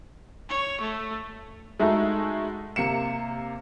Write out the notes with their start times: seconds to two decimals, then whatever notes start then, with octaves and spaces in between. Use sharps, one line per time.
0.50 C#5
0.81 A3
1.80 G#3 A3 D#4 E4 F#4 A4
2.76 C3 A#3 C#7 E7